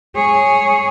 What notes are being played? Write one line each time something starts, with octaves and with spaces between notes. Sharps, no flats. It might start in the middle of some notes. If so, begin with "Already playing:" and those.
G#4 C#5